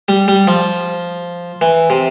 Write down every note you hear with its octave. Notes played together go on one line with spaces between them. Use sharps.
G3
G3
F3
E3
C3